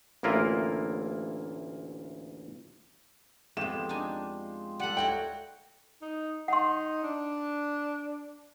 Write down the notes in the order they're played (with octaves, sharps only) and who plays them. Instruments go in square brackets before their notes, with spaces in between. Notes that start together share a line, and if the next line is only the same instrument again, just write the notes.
[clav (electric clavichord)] A1 D2 A#3 E4 F4 A#4
[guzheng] F2 B3 [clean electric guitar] G#3 F4 G4 [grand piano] E7
[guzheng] D4 D#4 G#5
[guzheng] G3 A4 [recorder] F#5
[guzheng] E4 F#4 C#5 [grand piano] G5
[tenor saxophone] D#4
[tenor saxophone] D#4 [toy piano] F#5 C6
[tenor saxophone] D4